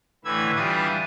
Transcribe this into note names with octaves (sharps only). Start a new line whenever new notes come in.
A2 D3 E3 B4 E6 G#6
E3 G3 D4 F4 D6 D#6